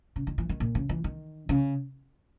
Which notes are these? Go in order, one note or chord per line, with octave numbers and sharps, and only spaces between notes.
C#3
D#3
E3
D#3
A#2
C#3
E3
D#3
C#3